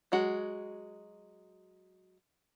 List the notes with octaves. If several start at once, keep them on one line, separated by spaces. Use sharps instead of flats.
F#3 G#3 F#4